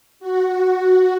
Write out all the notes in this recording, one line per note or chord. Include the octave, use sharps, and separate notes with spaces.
F#4